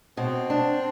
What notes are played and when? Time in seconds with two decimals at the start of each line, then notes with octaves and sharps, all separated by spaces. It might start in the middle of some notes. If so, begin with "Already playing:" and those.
0.17 B2 C4
0.50 D4